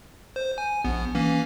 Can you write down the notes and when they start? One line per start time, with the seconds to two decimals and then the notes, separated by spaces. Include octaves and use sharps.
0.36 C5
0.58 G#5
0.84 A#1 B3
1.15 E3 A#3 C#4